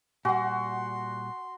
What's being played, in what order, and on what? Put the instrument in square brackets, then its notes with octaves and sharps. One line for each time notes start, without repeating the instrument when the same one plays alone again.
[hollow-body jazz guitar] A#2 G3 [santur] F#4 [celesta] F#5 G#5 [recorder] C6